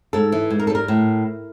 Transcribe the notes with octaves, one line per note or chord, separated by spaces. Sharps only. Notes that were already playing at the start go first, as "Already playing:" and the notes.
G#2 A4
E3
G#2
A#4
A4
G3 A#4
A2